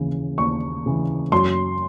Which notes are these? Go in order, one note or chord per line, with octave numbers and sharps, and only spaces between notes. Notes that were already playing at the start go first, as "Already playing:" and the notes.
Already playing: D#2 C#3 E3
D#2 C#6
C#3 E3
F#2 C6